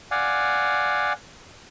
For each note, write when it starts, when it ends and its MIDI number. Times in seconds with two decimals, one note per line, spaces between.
0.11 1.13 74
0.11 1.13 77
0.11 1.13 78
0.11 1.13 80